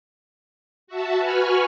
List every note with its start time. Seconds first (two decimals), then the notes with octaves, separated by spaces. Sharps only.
0.87 F#4 E5 A5
1.19 F#4 B4 G#5 B5 C#6 F6